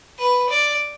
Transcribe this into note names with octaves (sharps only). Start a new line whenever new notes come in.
B4
D5